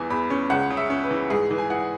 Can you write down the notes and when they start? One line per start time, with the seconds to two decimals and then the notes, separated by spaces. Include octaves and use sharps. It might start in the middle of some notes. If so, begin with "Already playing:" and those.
Already playing: E2 E3 G#5
0.10 E2 B5
0.30 C#4
0.50 C#2 F#5
0.70 C#3
0.77 E5
0.90 C#4
1.04 B4
1.11 E3
1.30 G#2 G#4
1.51 E3
1.58 G#5
1.70 E4 F#5